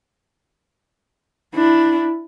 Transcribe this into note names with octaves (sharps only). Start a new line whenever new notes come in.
D4 E4